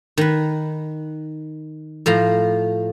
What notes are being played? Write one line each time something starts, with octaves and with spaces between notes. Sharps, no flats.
D#3 B4
A2 F3 A#5